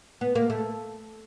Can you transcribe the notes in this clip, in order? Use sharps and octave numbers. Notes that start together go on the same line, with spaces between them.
B3
A#3
A3